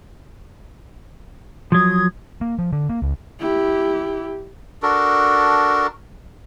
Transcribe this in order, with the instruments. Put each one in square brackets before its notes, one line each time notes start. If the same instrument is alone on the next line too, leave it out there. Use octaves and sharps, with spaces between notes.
[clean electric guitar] F3 F#3 [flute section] D#6 G#6
[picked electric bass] A#3
F3
D3
A#3
C#2
[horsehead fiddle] E4 G4
[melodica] D4 F#4 A4 A#4